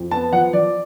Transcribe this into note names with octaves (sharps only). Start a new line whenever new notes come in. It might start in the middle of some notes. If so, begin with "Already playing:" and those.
Already playing: F2
B3 A5
F3 F#5
F3 D5